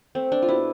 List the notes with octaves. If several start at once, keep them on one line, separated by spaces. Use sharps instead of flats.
A3 C4
D4
F4
B2 E4